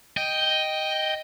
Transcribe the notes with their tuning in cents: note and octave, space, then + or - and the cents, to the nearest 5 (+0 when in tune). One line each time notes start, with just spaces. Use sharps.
D#5 +0 G5 +0